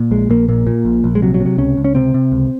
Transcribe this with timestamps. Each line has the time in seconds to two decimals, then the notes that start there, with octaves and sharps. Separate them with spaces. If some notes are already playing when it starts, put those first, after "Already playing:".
Already playing: A#2
0.11 A#1 G#3
0.30 A#1 A#3
0.49 A#2 A#3
0.67 A#2
0.85 A#1
1.04 A#1
1.15 G#3
1.22 C3 F#3
1.34 F#3
1.40 C3
1.46 F#3
1.58 C#2 C#4
1.77 C#2
1.85 C#4
1.95 C3 C4
2.14 C3
2.32 C#2